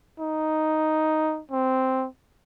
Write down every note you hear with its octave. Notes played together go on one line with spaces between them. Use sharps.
D#4
C4